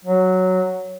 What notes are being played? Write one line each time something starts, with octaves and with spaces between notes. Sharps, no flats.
F#3